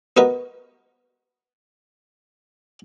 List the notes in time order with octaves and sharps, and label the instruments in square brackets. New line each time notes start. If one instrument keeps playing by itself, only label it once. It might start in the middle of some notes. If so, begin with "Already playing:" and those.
[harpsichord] B3 F#4 A#4 B4 D#5